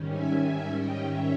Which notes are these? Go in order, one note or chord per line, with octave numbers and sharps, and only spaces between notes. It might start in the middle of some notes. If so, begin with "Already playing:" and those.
Already playing: G#2 D#3 G3 C#4
E5 G#5
E5 G#5
D#5 G5
C#5 E5